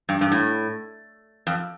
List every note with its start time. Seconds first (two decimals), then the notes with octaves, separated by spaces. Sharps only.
0.09 G2
0.21 G2
0.32 A2
1.47 F2